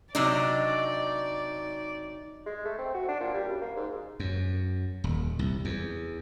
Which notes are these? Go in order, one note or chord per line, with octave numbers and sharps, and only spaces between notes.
C3 F#3 D4 D#4 D5
G#3
A3
C4
F#4
D4
A#2
G3
F#2
A#3
G#2
F#2
D#1
C2
E2